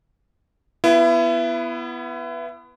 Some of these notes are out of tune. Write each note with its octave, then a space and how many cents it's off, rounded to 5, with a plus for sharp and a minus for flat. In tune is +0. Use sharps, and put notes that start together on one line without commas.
B3 +0 E4 +30